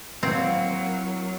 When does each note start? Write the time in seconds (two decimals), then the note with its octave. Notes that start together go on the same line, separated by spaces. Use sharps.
0.23 F#3 A#3 C4 E4 F5 F#5